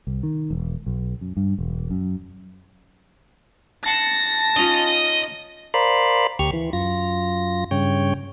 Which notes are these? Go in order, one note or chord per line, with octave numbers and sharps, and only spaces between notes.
C2
D#3
E1
B1
F#2
G2
E1
F#2
F#5 A5 C6 C#6 A#6
C#4 D#4 F4 D#5
A#4 C5 D5 F5 B5
D2 G4 C#6 F6
E3
F#2 F4 A#6
G2 C#3 C#5 G5